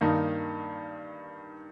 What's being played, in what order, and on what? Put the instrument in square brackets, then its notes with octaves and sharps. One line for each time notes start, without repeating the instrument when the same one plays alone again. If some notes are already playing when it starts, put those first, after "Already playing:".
[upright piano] G2 D#3 A#3 D#4